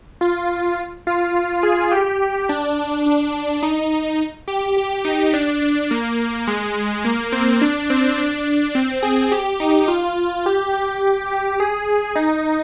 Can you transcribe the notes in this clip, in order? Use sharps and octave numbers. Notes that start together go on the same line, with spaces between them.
F4
F4
G#4
G4
D4
D4
D#4
G4
G4
D#4
D4
D4
A#3
G#3
A#3
C4
D4
C4
D4
C4
G#4
G4
D#4
F4
G4
G4
G4
G#4
D#4